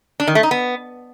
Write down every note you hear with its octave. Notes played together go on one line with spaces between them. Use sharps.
D4
D#3
A3
D#4
B3